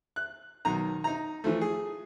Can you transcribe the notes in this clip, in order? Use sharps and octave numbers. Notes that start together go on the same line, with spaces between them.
F#6
B1 D#3 A#5
D#4 A#5
E3 F3 A3
G#4